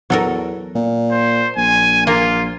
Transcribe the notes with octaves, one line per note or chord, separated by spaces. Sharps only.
E2 F#3 A4 A#4
A#2
C5
A#1 G#5
A#3 F4 A#4